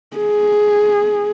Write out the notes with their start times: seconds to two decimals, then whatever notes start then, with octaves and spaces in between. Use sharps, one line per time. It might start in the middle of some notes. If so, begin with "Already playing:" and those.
0.17 G#4